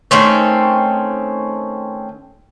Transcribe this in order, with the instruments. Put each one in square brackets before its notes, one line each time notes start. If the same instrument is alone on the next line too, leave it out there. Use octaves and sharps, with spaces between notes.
[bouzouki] D#3 A3 C4 C#4